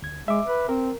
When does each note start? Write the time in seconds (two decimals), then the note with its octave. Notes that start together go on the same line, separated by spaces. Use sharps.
0.02 D2 G#6
0.28 G#3 E5 D6
0.47 B4
0.69 C4 A#4